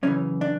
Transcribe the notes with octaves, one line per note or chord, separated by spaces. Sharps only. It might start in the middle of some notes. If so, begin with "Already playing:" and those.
F#2 C#3 E3 C#4
D4